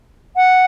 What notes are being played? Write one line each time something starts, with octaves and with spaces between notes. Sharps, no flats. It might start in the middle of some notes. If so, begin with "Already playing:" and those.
F#5